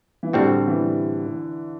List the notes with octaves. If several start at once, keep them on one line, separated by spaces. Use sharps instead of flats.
E3
A2 D3 G3 C4 F#4
E3